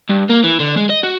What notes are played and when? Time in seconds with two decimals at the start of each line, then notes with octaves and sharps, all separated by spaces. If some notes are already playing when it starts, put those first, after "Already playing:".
0.10 G2
0.30 A#3
0.44 E3
0.60 D3
0.77 G#3
0.90 D#5
1.03 F#4